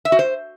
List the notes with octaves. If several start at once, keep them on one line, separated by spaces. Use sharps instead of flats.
E5
F#4
C5